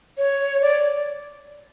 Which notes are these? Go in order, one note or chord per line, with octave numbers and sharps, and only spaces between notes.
C#5
D5